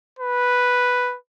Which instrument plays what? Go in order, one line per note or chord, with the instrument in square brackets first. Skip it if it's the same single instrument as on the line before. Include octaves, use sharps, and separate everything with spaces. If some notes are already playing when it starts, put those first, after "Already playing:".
[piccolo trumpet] B4